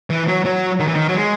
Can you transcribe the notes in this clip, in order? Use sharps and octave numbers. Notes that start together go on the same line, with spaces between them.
E3
F#3
F#3
D#3
E3
D#3
F#3
G#3